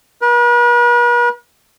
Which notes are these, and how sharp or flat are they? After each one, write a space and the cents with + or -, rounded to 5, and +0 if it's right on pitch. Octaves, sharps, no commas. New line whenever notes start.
B4 -45